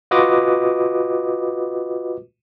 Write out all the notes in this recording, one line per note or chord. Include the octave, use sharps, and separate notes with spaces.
F4 F#4 B4 D#5 D6 D#6